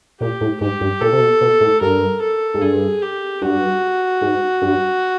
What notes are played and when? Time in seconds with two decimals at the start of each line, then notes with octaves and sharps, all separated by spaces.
0.20 A#2 G4
0.41 A2
0.61 G#2 G4
0.81 G2
1.01 A#2 A4
1.13 C3
1.20 B2
1.41 B2
1.60 A2
1.81 G2 A#4
2.22 A4
2.54 G#2
2.61 G2 G#4
3.02 G4
3.42 G2 F#4
4.21 G#2
4.62 G2